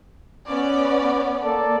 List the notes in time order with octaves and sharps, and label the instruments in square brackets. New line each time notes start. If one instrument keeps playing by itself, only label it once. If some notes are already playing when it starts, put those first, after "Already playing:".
[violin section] B3 C#4 D5
[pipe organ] A#3 A4 D5